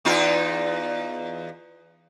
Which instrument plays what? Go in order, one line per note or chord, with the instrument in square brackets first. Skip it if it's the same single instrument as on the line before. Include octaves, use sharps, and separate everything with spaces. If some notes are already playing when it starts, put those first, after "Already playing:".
[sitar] E2 D#4 F4